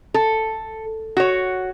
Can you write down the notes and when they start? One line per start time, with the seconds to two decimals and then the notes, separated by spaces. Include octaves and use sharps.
0.14 A4
1.17 F#4 C#5